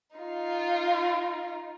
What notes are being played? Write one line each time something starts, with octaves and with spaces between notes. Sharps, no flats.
D#4 F4